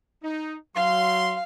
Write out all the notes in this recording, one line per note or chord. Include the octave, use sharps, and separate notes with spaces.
D#4
F#3 F5 C6